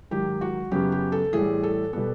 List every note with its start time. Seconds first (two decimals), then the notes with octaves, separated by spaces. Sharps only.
0.11 G#2 D#3 F#3 G4
0.41 F#4
0.71 F#2 C#3 F#3 B3 G4
0.92 G4
1.12 A4
1.33 A2 E3 G3 G#4
1.63 A4
1.93 B2 G3 B3 A4